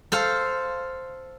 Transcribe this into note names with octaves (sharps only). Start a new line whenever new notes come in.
A4 C5 F5